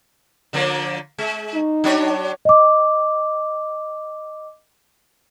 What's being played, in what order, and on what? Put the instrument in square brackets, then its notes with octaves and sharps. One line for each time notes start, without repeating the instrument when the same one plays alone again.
[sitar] D3 F3 A#3
G#3
[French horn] D#4
[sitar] F#3 D4 C#5
[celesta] D#5 D6